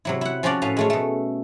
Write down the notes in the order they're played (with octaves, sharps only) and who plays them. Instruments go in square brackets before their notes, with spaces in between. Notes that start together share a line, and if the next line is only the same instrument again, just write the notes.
[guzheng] C3 F#3 E4
E4 F#5
F3 C#4 F4 F#4 D5
A2 C#4 B4 F5
G#3 A3 C#4
B2 A3